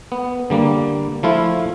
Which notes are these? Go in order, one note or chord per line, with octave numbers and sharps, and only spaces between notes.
B3
D3 G3 A#3
F3 A3 E4 F4